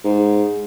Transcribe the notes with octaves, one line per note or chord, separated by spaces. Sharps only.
G#2